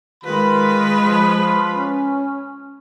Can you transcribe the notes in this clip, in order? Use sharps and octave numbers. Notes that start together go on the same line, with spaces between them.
D#3 G#3 F4 B4 B5
F3
C#4